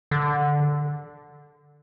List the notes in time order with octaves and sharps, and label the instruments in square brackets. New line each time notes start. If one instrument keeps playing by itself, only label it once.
[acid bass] D3